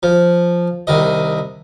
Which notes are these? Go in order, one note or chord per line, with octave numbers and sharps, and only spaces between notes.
F3
C2 D#3 D#5